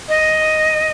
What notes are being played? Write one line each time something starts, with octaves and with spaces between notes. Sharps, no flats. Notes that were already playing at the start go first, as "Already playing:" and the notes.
D#5